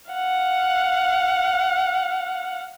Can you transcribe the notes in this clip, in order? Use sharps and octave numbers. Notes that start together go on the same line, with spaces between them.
F5 F#5